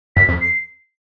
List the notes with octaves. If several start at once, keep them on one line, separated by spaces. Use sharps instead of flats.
F#2 B6
F2
C7